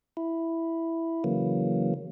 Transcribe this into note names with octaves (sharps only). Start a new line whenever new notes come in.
E4
C#3 E3 F#3 A#3